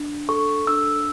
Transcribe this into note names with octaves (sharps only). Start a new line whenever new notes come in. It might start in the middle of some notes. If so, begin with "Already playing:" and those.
Already playing: D4
A4 C#6
D4 E6